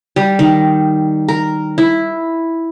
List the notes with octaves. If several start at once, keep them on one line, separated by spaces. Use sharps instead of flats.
G3
D#3
A#4
E4